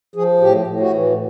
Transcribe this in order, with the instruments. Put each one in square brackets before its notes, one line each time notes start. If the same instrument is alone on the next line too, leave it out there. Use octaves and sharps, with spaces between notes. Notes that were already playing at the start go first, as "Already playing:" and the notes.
[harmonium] F3 G#4
A2 G4
A2
F#4
E3